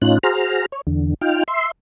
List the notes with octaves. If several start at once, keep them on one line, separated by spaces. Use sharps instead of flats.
A2 C#4 D#4 F4 F#6
F#4 G#4 C5 A#5 F6
C#5
E2 D3
D#4 F4 G5 F6
E5 C6